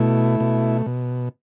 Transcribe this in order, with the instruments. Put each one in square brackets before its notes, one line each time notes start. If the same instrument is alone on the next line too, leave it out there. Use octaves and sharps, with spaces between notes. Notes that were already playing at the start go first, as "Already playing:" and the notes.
Already playing: [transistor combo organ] B2 A3 E4
B2
B2